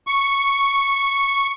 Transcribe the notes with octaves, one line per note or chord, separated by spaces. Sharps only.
C#6